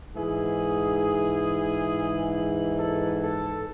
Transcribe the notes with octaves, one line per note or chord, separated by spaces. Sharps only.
G#2 E3 G#4
A4
A4